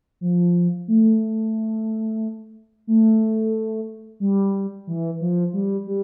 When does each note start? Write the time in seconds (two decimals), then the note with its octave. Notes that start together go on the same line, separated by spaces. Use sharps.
0.21 F3
0.88 A3
2.87 A3
4.20 G3
4.87 E3
5.21 F3
5.53 G3
5.87 G3